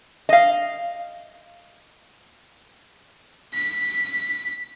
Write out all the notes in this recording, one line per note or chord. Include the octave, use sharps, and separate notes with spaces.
D#5 F5
B6